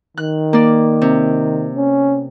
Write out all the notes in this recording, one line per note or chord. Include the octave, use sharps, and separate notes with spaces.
D#3 F#6
A#3 D5
C3
C#4